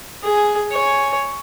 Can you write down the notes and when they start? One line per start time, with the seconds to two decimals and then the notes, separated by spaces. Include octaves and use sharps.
0.23 G#4 G#5
0.72 C#5 G#5